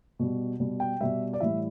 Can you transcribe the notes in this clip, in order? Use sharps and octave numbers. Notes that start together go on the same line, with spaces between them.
B2 G3
B2 G3
G5
B2 G3 E5
D5
A2 E3 G3 E5